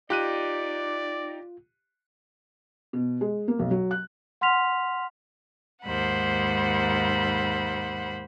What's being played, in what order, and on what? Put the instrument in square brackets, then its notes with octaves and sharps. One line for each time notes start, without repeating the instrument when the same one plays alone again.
[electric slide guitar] D#4 [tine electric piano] F4 [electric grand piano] G4 F#6 D#7 [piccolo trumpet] D5
[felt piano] B2
G#3
A#3
B1
F#3
F#6
[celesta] F#5 C6 F6 B6 F7
[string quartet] D#2 G#2 C5 F#5 B5